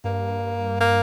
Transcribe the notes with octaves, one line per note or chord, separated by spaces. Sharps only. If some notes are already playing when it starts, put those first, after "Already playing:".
G2 A#3
A#3